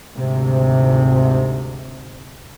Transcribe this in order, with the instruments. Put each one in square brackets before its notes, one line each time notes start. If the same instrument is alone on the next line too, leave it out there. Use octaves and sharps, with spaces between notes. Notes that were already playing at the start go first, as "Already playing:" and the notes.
[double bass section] G#1 D2 G#2 C3